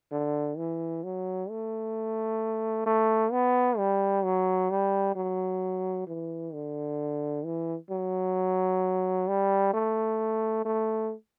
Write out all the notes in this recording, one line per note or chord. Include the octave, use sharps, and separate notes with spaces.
D3
E3
F#3
A3
A3
B3
G3
F#3
G3
F#3
E3
D3
E3
F#3
G3
A3
A3